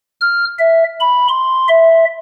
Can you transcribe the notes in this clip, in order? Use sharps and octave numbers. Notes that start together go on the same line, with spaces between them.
F6
E5
B5
C6
E5